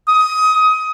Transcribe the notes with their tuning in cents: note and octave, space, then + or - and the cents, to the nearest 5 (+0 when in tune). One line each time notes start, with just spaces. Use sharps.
D#6 +20